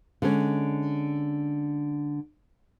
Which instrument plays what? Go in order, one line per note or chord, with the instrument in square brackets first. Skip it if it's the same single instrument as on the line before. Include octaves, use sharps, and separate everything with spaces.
[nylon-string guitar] D3 G#3 C#4